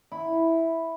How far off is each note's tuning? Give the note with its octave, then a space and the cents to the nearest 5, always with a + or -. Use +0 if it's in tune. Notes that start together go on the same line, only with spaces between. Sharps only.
E4 -5 B5 +0